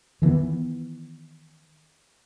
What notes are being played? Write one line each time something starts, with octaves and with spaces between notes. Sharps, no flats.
D#3 E3 A3 B3